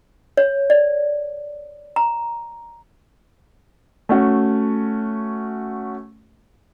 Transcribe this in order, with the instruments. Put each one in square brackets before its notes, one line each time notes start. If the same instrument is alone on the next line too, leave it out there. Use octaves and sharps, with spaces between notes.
[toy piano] C#5
D5
A#5
[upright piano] A3 C#4 F#4